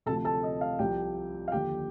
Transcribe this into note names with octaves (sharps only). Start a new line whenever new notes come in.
D2 C3 F3 A4 A5
A4 A5
D#5
F5
C2 C3 F3 G4 G5
F5
D#2 D3 F3 G4 G5